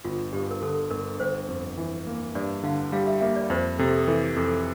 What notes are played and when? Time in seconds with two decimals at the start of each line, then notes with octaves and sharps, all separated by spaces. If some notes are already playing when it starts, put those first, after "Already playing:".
0.05 G1 F4
0.33 G2 G4
0.51 A#4
0.62 D3 A4
0.91 G1 A#4
1.20 G1 C5
1.48 F2
1.78 E3
2.07 A#3
2.35 G2 D5
2.63 D3 F5
2.92 G3 F5
3.07 E5
3.21 A#3 E5
3.36 D5
3.50 F2 C5
3.79 C3 A4
3.97 A4
4.08 E3 G4
4.36 F2 A4